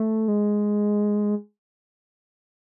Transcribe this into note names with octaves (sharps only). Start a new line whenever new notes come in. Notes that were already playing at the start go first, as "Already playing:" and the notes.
Already playing: A3
G#3